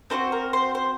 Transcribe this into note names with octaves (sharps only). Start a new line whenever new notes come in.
C4 D#4 F#4 C5
A#4
C5
C5